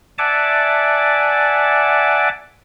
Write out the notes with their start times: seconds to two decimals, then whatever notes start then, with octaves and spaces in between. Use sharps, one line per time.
0.18 D5 E5 F#5 G#5 A5 D6